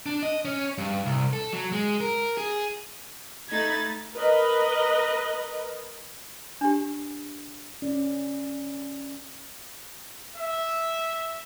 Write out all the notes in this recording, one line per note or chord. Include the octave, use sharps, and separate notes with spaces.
D4
D#5
C#4
G2
C2
A4
F#3
G#3
A#4
G#4
A3 D#4 B5 G#6 A6
A#4 B4 D#5
D4 G4
C#4 D5
E5